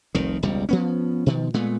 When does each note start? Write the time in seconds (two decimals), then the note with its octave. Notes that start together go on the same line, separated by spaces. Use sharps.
0.15 F1 C2 D#3
0.43 E1 C#2 G3
0.69 F3 B3 C#4
1.26 B2 D#3 F3
1.54 A#2 G#3 A3 B3